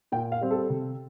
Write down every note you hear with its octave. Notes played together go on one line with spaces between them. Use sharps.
A#2 G5
F5
G3 C4
A4
C3